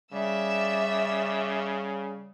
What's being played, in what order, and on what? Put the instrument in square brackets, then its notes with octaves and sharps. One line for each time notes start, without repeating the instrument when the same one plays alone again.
[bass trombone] C#3 [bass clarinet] G3 [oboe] D5 [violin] E5 E6